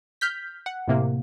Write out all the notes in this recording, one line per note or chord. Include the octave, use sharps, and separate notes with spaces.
F6 G6 B6
F#5
A2 C3 A#3